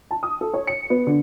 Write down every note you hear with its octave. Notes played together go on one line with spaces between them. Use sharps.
A5
D#6
A4
C#5
C#7
B3
D3